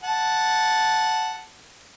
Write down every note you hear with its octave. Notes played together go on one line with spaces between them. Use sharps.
F#5 A5